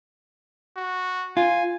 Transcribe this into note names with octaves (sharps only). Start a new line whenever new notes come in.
F#4
F4 G#5